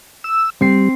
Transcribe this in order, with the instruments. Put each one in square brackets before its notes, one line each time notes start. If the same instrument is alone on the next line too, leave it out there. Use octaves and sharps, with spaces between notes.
[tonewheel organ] E6
[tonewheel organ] G3 [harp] C4 C7